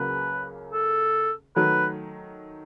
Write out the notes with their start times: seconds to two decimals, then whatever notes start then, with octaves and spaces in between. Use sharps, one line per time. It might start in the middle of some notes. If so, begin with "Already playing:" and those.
Already playing: C#2 C#3 F#3 A#3 B4
0.71 A4
1.56 D#3 F#3 A3 B4